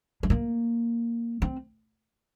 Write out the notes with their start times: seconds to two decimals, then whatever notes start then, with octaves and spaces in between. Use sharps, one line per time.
0.23 G#3
0.30 A#3
1.42 C4